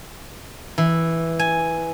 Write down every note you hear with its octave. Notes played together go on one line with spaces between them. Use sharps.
E3
G#5